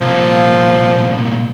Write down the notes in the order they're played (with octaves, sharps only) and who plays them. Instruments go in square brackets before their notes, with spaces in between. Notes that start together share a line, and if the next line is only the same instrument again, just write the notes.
[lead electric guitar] C2 A#2 [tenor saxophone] F3